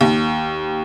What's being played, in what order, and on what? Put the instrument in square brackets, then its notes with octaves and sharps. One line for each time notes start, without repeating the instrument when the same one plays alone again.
[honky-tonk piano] D#2